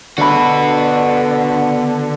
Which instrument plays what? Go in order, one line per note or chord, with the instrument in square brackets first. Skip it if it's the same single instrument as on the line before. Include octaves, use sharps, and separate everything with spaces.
[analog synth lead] D3 [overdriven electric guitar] B3 F#4 [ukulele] D4 B5